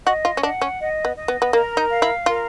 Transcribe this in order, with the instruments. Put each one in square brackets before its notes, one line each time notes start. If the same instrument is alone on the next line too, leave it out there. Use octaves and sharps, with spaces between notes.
[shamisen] F#4 [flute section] D#5
[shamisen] F4
C#4
[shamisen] D4 [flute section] F#5
[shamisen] C#4
[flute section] D#5
[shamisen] B3
[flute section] D#5
[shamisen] B3
B3
[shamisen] A#3 [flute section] A#4
[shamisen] D#4
[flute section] F5
[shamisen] E4
[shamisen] F4 [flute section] A#4